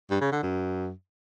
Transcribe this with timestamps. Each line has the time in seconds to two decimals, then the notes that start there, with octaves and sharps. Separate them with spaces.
0.10 G2
0.21 C#3
0.32 D3
0.43 F#2